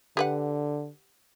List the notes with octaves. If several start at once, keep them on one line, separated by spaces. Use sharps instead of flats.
D3 G4 B4 F#5